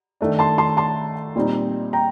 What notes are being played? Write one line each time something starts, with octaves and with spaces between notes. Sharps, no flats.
D#3 A3 D4
A5 C6
A5 C6
A5 C6
A#2 G3 C4 D#4
G5 A#5